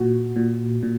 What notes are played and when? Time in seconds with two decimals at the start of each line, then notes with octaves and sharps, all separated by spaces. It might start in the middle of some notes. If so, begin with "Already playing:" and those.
Already playing: A#2 F#4
0.36 A#2
0.83 A#2